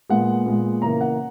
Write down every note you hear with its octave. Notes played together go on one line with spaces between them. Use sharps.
A#2 G#3 B3 F#5
A#2 G#3 B3
C#3 E3 A#3 A#5
F#5